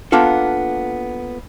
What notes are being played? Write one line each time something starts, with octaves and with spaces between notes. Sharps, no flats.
A#3 B3 D4 F4 A4